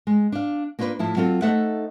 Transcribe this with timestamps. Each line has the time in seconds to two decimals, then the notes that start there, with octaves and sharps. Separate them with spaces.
0.07 G#3
0.32 D4 F5
0.79 A#3 D4 F4 G#4 B4
0.99 A2 F3 E4 A5
1.16 F#3 C4 F4 A4
1.42 A3 D#4 A4 C5 E5 F#5